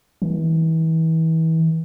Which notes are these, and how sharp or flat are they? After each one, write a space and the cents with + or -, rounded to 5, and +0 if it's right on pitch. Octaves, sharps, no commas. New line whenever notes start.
E3 -35